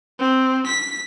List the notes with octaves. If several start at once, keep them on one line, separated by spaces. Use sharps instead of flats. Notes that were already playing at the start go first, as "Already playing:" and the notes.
C4
B6